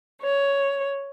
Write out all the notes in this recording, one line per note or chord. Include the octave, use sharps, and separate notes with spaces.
C#5